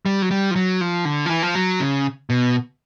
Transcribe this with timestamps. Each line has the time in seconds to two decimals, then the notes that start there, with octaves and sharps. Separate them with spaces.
0.06 G3
0.22 F#3
0.31 G3
0.51 F3
0.56 F#3
0.81 F3
1.05 D3
1.26 F3
1.29 E3
1.43 F3
1.55 F#3
1.80 C#3
2.30 B2